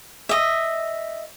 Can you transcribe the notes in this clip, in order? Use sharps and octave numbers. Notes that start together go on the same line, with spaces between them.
D#5 E5